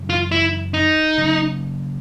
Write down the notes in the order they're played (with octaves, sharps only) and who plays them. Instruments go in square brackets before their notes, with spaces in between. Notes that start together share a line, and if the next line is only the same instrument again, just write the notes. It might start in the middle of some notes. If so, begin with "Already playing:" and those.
Already playing: [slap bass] F#2 C#3 E3
[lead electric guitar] F4
E4
D#4
[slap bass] C#3 F#3 A#3